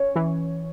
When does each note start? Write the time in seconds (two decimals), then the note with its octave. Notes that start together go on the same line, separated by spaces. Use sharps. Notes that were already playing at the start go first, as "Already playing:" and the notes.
Already playing: C#4 C#5
0.16 E3